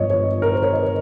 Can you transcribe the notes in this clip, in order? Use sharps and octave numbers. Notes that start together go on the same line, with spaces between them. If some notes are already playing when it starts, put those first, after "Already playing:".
Already playing: G1 G2 F3 C#5 D#5
C#5
A#4
C5
C#5
D#5
C#5